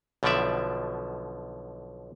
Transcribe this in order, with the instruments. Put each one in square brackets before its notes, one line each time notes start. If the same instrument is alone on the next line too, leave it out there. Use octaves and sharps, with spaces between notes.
[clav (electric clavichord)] B1 B2 D3 F3 D5 E5